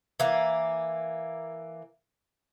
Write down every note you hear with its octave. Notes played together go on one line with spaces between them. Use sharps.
E3 A#3